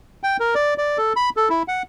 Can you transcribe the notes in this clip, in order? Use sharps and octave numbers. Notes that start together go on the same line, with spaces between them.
G5
A#4
D5
D5
A4
B5
A4
E4
F#5